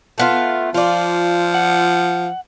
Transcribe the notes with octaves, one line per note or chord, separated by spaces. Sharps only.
A3 B3 F4
F3 F4 D5
F#5